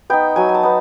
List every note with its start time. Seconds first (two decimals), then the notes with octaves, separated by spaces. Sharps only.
0.10 B3 D#4 G5
0.36 F#3 G#5
0.49 G#5
0.55 A5
0.63 B3 D#4